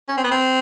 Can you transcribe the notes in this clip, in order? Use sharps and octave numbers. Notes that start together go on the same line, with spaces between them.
C#4
C4
B3
C4